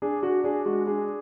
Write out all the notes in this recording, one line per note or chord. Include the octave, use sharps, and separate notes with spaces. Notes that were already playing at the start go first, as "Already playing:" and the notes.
D4 G#4
D4 F#4
D4 G#4
G#3 F#4
D4 G#4